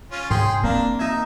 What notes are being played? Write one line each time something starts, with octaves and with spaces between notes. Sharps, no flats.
C#4 F4
G#2 G#4 G5 C6
A#3 C4 D4
D#4 E5 G#6